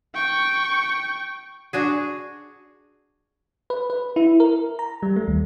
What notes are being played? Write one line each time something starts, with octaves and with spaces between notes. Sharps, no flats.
G5 C#6
D4 F#4 G#4
B4
B4
E4
A#4
A#5
G3
A3
D#2